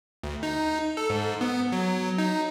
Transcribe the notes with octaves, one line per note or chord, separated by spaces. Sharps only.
D2
D#4
A4
G#2
B3
F#3
D#4